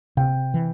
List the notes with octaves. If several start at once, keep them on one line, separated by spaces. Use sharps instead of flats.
C3 G5
E3